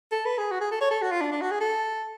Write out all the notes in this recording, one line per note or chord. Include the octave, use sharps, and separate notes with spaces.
A4
B4
G#4
F#4
G#4
A4
C#5
A4
F#4
F4
D4
D4
F#4
G#4
A4